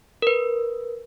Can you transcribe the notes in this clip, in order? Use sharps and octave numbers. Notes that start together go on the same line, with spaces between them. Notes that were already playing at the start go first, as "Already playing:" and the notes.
A#4 B4